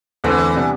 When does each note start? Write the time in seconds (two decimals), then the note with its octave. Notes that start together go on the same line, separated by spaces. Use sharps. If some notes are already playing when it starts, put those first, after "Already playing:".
0.24 E2 D3 E3 A3 C4
0.56 C3 G3 B3 D4